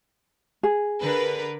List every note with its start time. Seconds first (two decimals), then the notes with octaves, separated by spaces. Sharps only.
0.63 G#4
1.02 D3 A#4 B4